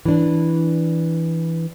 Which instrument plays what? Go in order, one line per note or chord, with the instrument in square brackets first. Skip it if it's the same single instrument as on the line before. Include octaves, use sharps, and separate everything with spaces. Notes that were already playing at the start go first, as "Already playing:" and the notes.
[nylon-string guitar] E3 D4